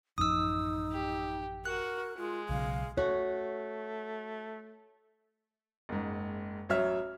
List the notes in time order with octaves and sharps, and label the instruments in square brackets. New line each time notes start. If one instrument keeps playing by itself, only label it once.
[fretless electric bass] A1 F#2 F3 [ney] D#4 [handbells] D#6 E6
[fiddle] G4
[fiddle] F#4 [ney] A#4 [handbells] F#6
[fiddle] G#3 [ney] F4
[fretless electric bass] B1 C#3 F#3 [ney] F5
[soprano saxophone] A3 [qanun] F#4 [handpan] C#5
[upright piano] F#1 G#2
A1 F#3 C#5 E5 F6